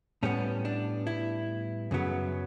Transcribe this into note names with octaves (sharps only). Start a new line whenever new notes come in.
A2 G3 B3 C#4
D4
E4
F#2 C#3 F#3 B3